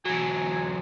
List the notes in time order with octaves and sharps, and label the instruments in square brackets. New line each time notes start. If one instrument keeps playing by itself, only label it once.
[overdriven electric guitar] E3 F#3 [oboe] G#5